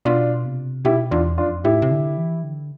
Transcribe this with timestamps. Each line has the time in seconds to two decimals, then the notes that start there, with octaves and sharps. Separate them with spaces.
0.05 B2 D4 F4
0.45 C3
0.85 B2 E4 G4
1.11 E2 D4 F4
1.38 F2 D4 F4
1.64 A2 E4 G4
1.82 C3
1.91 D3
2.17 E3
2.43 D3